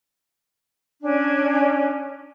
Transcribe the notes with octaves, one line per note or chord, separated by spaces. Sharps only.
C#4 D4 G#5